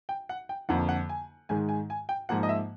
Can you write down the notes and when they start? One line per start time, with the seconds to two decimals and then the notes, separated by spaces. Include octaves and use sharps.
0.09 G5
0.29 F#5
0.49 G5
0.69 F2 D3 F3 A#3 F#5
0.89 F#5
1.09 G#5
1.49 G#2 D#3 G#3 G#5
1.69 G#5
1.90 G#5
2.09 G5
2.29 G#2 F3 A#3 F#5
2.43 D#5
2.49 E5